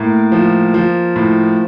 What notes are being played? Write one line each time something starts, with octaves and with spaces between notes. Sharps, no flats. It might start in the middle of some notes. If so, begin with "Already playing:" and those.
Already playing: A2 A#3
F3
F3
A2